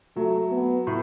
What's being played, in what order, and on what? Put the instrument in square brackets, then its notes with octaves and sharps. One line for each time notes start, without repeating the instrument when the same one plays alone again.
[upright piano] F#3 [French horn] A3
[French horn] B3
[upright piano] A2